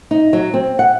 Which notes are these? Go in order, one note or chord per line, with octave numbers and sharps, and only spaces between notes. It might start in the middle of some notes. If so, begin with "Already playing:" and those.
D#4
F#3
C4
F#5